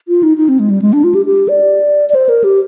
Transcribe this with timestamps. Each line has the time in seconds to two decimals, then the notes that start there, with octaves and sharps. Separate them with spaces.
0.08 F4
0.23 D#4
0.37 D#4
0.49 C4
0.59 G#3
0.70 G3
0.82 G#3
0.93 D4
1.04 F4
1.15 G4
1.26 G4
1.49 D5
2.09 D5
2.15 C5
2.29 A#4
2.44 G4